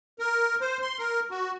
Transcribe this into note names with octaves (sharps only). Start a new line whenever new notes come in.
A#4
C5
C6
A#4
F#4